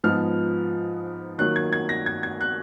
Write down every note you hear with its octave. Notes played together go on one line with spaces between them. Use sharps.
G#2 F3 B3 D#4 F6
D#3 F#3 A#3 F#6
G#6
G#6
A#6
G#6
G#6
F#6